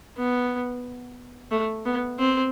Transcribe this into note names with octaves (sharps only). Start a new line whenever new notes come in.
B3
A3
B3
C4